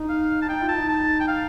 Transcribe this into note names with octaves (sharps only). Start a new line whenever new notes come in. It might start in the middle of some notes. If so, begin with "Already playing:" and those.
Already playing: D#4
F5
A5
D#4 G5
F4
A5
D#4
A5
G5
F5